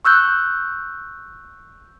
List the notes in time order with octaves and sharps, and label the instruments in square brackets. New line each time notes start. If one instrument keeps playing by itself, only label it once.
[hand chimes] C#6 E6 F#6 G6